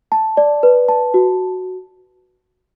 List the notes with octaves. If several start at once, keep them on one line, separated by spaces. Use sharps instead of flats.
A5
D5
B4
A5
F#4